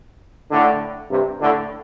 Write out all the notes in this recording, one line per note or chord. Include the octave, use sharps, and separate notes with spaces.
A2 D3
G2 C3
A2 D3